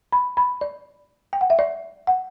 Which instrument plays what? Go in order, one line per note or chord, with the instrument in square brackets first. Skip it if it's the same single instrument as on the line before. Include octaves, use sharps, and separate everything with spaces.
[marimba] B5
B5
D5
G5
F#5
E5
D5
F#5